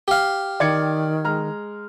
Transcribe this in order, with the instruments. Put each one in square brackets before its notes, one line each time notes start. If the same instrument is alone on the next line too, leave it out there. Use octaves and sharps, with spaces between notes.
[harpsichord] G4 F5
[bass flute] D#3 [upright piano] D5 G#6 C#7
[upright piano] G#3 A#5 F6